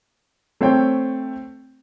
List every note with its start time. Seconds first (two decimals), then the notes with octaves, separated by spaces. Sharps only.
0.61 A3 C4 C5 C#5 G5